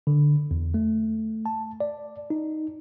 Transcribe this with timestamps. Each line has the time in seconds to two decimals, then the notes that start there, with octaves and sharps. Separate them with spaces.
0.07 D3
0.51 E2
0.74 A3
1.46 A5
1.80 D5
2.30 D#4